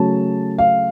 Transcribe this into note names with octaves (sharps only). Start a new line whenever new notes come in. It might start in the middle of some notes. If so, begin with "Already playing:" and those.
Already playing: C#3 F#3 A3 A5
F5